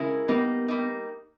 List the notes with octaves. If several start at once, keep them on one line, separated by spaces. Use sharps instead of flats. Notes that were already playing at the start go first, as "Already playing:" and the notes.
Already playing: C#3 G#3 C#4 E4 A#4
G3 A#3 B3 D#4
G3 A#3 D#4